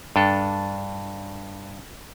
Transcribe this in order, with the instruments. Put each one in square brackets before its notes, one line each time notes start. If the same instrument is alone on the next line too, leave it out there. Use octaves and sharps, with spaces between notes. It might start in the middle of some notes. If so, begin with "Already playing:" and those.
[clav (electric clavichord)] G2 D4 A4